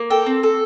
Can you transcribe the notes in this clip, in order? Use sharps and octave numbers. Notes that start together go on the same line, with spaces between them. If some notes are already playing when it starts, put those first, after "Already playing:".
Already playing: A#3
A4 G5
C4
A4